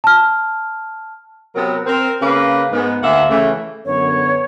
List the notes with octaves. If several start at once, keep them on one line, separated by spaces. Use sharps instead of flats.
A5 F6
C3 F#3 B3 A#4
C4 A#4
C#3 A#3 B4
G#2 B3
D2 A#3 E5 F#5
C#3 E3 A3
F#2 D3 B3 C#5